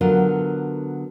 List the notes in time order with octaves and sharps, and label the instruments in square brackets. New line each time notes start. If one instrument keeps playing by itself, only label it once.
[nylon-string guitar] D3 F#3 B3 F4 A4 A#4